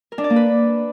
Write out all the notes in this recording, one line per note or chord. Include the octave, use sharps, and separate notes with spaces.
A#4
D4
D5
A#3
B4